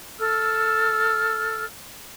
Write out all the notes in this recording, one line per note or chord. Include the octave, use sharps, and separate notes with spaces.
A4 E6 F6